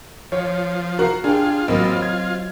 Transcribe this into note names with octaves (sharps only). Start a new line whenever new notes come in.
F3 C#5
F#4 A#4 F5 C7
D4 F4 G4 G#4
A1 F#3 A#3 C4 D#5
G#6